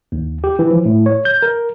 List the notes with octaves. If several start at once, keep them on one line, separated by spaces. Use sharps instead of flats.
D#2
G4
E3
F3
A2
C#5
G6
A#4